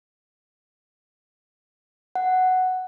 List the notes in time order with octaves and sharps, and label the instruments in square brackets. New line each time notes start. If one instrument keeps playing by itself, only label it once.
[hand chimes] F#5